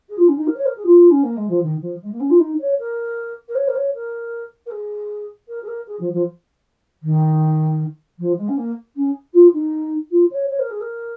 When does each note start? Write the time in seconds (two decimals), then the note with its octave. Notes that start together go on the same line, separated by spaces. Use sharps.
0.08 G#4
0.18 F4
0.28 C#4
0.36 D#4
0.47 A#4
0.56 C#5
0.65 A#4
0.76 G#4
0.85 F4
1.10 C#4
1.23 A#3
1.36 G#3
1.49 F3
1.62 D#3
1.81 F3
2.01 G#3
2.11 A#3
2.19 C#4
2.29 F4
2.39 D#4
2.59 C#5
2.78 A#4
3.48 A#4
3.55 C#5
3.67 A#4
3.75 C#5
3.94 A#4
4.66 A#4
4.70 G#4
5.48 A#4
5.62 G#4
5.67 A#4
5.86 G#4
5.99 F3
6.12 F3
7.02 D#3
8.18 F3
8.37 G#3
8.48 C#4
8.57 A#3
8.95 C#4
9.33 F4
9.53 D#4
10.11 F4
10.31 C#5
10.49 C#5
10.59 A#4
10.70 G#4
10.80 A#4